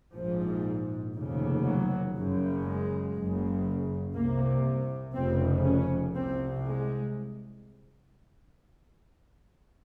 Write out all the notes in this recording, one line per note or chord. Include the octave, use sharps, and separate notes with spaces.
A#1 G#2 F3
F1 D#2 C#3
F#3
F#1 F#2 C#3
G#3
F#1 F#2 C#3
C2 C3 A#3
F1 F2 C#3 C4
C#4
C2 C3 C4
G#3